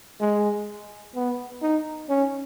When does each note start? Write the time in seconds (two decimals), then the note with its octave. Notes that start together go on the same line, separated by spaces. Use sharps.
0.21 G#3
1.16 B3
1.62 D#4
2.09 C#4